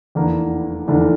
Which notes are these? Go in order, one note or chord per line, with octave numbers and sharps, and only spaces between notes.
F1 E2 E3 A#3 D4
F1 E2 E3 A#3 D4